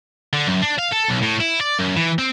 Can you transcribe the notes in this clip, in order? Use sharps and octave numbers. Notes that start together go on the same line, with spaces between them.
D3
F#2
D4
F5
A4
B1
A2
E4
D5
F#2
E3
C4